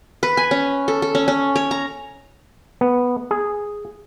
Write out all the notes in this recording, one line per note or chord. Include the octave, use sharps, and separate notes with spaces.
B4
G#5
C#4
A4
A4
C#4
C#4
C#5
A#5
B3
G#4